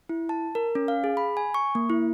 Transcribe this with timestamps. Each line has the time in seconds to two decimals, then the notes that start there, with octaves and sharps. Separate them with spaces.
0.09 E4
0.29 A5
0.55 A#4
0.75 C#4
0.88 F5
1.04 G#4
1.17 B5
1.37 G#5
1.54 C#6
1.75 A#3
1.90 E4